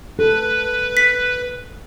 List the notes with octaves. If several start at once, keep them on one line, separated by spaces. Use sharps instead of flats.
A4 B4
B6